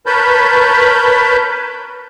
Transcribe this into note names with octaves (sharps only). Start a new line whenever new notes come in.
A#4 B4 C#5 A5 B5 G6